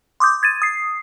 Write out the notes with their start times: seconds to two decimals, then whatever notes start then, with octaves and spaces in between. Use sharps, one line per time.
0.20 C6 D6 D#6 G6
0.43 G#6 A6 D#7
0.62 D#6 C7